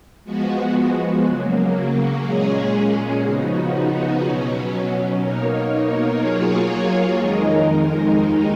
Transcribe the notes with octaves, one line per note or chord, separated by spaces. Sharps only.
F3 G#3 B3 F#4
C#3 F#3 A#3
A#2 G#3 C#4 G#4
C#3 F3 B3 D#4 F#4
B2 F#3 C#4
B2 A#3 D#4 A#4 C#5
F#3 A#3 F4 G#4 C#5
F2 D#3 G#3 D#4 A#4
D#2 D#3 G#3 D#4